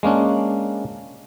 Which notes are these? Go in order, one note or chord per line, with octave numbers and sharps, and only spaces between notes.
G#3 A#3 C#4 D4